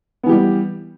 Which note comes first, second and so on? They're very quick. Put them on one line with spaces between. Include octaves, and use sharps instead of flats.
B3 E3 G4 G3